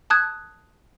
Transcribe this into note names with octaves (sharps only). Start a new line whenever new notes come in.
A5 D#6 F#6 G#6